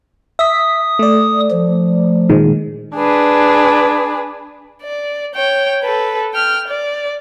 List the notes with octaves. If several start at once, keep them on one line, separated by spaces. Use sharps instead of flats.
E5 D#6 B6
A3 D5
F3
A#2 D#3 G#3
D4 G#4 B4
D5
C#5 G5
A4 B4
G5 F6
D5